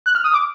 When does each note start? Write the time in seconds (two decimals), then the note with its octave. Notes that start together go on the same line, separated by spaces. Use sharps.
0.06 F#6
0.15 F6
0.24 D#6
0.34 D6